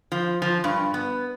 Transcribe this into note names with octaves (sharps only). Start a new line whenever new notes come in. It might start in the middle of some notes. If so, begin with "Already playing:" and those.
F3
F3
G2
B3